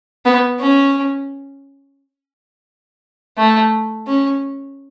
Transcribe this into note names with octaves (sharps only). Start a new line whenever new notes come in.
B3
C#4
A3
C#4